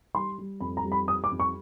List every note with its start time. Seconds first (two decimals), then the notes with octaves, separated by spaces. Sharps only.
0.14 G3 C6
0.38 G3
0.60 F2 B5
0.77 A#5
0.84 G3
0.92 B5
1.07 G3 D#6
1.24 D6
1.31 F2
1.40 C#6